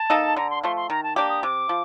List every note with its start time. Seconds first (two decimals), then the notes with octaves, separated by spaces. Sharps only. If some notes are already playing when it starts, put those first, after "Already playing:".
Already playing: A5
0.10 A#3 D#4 A4
0.36 D3 A#5
0.50 C6
0.63 F3 A3 C6
0.76 C6
0.90 D#3 A#5
1.03 A5
1.16 A#3 D4 G4 D6
1.29 D#6
1.43 C3 D6
1.69 F3